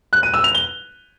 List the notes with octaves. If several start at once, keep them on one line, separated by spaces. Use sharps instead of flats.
F#6
D#7
E6
F7
G7